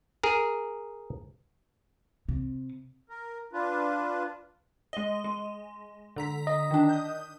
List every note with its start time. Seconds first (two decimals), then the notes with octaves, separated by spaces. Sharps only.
0.24 G#4 A#4
2.29 C3
3.09 A#4
3.53 D4 F4 B4
4.93 G#3 D#5
5.24 G#3
6.16 D3 A#5 B6
6.47 D#5
6.71 D#3 D4
6.89 D#6 G6